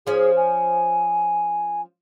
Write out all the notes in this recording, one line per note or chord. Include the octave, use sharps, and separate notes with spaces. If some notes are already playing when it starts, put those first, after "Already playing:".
F3 C#4 G#4
G#5